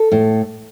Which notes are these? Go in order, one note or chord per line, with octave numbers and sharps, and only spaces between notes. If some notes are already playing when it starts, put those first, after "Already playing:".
Already playing: A4
A2